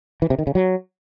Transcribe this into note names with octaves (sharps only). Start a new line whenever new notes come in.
E3
C3
D#3
C#3
F#3